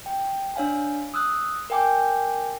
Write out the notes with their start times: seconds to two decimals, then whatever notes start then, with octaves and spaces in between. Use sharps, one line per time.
0.06 G5
0.56 D4 C#5 F5 G#5
1.14 D#6 E6 F#6
1.70 A#4 F5 G5 G#5 D6 G6